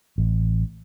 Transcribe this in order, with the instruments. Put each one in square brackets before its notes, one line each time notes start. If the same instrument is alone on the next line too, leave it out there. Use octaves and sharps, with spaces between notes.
[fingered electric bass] A1